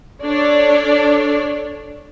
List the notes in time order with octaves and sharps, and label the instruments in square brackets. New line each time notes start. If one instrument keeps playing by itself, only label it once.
[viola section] D4 A4 C#5 D5